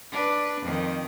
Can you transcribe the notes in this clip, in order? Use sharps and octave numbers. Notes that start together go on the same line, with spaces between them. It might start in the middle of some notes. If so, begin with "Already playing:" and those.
D4 B4
F2 D#3